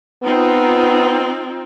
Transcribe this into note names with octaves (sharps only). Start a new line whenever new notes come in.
B3 C4 D#4 F4